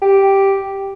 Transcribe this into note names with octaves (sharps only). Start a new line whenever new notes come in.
G4